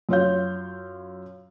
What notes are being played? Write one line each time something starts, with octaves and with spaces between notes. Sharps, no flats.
F#2 F4 C#5 F5 G6